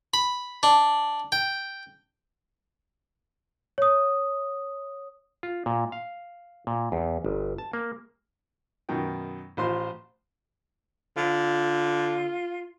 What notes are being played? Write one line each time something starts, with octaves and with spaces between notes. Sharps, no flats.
B5
D4
G5
C#5 D#6
F4
A#2
F5
A#2
E2
G1
A5
A#3
F#2 B2 D#3 G5
A1 F4 C5 C6
D3 F4